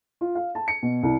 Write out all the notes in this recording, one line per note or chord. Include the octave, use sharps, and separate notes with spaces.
F4
F5
A5
C#7
B2
C2